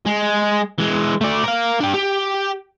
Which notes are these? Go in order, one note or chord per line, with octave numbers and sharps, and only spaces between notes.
G#3
E3 G#3
A3 D5
A#4 F5
D4 G4
G4